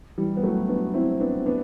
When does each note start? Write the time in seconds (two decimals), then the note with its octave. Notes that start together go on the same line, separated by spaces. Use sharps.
0.18 E3 G3
0.37 B3
0.43 F#3 A3
0.69 B3 D4
0.94 C4 E4
1.20 B3 D4
1.46 B3 D4